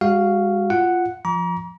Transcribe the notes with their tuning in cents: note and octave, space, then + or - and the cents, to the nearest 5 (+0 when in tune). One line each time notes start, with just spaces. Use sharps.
G#3 -40 F#4 +5 F5 -5
F4 -10 F#5 +0
F3 +0 A#5 +35 D6 -40